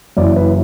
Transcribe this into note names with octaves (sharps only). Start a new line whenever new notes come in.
F#1 F#2 E3 D5
B4